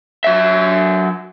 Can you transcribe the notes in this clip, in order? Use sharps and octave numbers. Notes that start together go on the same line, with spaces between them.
F#3 E5